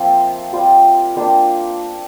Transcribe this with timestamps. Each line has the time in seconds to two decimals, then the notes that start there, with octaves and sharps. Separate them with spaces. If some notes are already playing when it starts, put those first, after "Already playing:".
Already playing: F3 A#3 C4 F4 E5
0.53 G3 C4 F4
1.16 A#3 D4 F4 G5